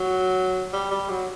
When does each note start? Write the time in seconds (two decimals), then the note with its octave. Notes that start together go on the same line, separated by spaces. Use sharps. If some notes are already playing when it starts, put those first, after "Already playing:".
Already playing: F#3
0.73 G3
0.91 G3
1.09 F#3